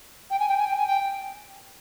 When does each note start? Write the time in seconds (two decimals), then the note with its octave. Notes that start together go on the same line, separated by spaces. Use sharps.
0.30 G5
0.39 G#5
0.48 G5
0.58 G#5
0.67 G5
0.77 G#5
0.87 G5